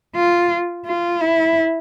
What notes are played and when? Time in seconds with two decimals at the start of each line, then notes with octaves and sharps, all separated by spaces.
0.15 F4
0.86 F4
1.21 E4